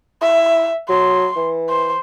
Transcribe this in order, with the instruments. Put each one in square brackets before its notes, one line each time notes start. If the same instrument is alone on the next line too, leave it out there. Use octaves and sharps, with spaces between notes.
[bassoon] E4 [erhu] E5
[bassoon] F#3 [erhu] C6
[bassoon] E3
[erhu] C5